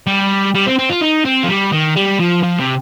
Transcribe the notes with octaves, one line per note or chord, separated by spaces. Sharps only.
G3
G3
C4
C4
F4
D#4
C4
F3
G3
D#3
G3
F3
F3
C3